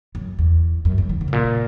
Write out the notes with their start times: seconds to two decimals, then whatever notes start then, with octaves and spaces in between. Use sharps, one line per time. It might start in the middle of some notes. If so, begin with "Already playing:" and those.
0.15 F#2
0.39 E2
0.85 F#2
0.98 F#2
1.09 D#3
1.21 C#3
1.28 G#2
1.33 A#2